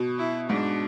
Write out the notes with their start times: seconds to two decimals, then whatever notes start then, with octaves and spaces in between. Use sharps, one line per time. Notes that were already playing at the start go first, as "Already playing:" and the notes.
Already playing: B2
0.18 E4
0.49 G#2 D4